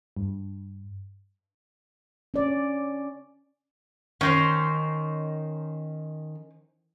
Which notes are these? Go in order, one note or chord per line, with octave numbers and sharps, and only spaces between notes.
G2
C#4 D5
D#3 C#4 D#4 C5